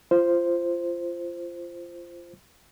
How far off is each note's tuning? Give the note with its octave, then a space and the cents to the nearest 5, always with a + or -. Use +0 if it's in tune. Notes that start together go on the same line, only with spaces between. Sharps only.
F4 -20 C5 +0